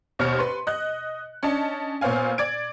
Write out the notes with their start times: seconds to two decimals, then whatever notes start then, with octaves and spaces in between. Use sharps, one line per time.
0.19 D#2 B2 C5 C#5 F6 C#7
0.38 B4 C6
0.67 D#5 F#6
1.43 C#4 D4 D#5 A5
2.01 A#2 B3 C5 C#5 F5 G#5
2.38 D5 G#6 D7